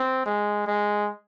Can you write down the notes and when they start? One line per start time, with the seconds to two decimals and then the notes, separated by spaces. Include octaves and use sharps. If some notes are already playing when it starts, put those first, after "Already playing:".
Already playing: C4
0.26 G#3
0.67 G#3